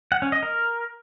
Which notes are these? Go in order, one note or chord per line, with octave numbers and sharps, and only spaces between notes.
F#5
C#4
D#5
A#4